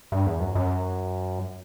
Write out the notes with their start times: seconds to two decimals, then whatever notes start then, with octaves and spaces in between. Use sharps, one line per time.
0.12 G2
0.27 E2
0.41 F#2
0.55 F#2